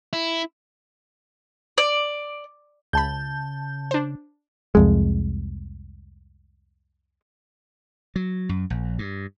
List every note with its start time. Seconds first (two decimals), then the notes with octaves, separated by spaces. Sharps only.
0.13 E4
1.78 D5
2.93 C#2 C#3 A5 B5 G6
3.91 D4 C5
4.75 C2 F2 G#3
8.16 F#3
8.49 F#2
8.70 A#1
8.99 G2